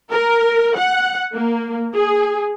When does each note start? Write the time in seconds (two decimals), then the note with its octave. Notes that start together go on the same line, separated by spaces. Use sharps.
0.11 A#4
0.77 F#5
1.34 A#3
1.95 G#4